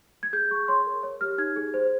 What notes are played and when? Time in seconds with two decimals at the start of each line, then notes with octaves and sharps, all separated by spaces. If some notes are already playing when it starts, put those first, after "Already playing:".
0.23 G#6
0.33 G#4 G6
0.51 G#4 C#6
0.68 C#5 C6
0.87 A#4
1.03 C#5
1.21 G4 F6
1.38 D#4 G#6
1.56 G#4
1.74 C5